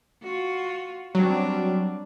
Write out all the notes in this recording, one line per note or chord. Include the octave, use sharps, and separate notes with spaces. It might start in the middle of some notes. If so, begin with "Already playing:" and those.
F4 F#4
F#3 G3 C4 D4